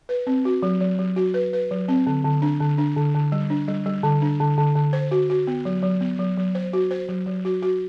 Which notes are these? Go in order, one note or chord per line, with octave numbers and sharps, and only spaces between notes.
B4
C4
F#4
F#3
F#3
F#3
F#4
B4
B4
F#3
C4
D3
D3
D4
D3
D4
D3
D3
G3
D4
G3
G3
D3
D4
D3
D3
D3
C5
F#4
F#4
B3
F#3
F#3
B3
F#3
F#3
C5
F#4
C5
F#3
F#3
F#4
F#4